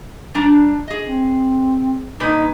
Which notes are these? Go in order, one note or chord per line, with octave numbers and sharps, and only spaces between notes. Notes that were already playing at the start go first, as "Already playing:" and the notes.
G3 D4 A#5
G#4 D#5
C4
G2 A#2 D#4 B4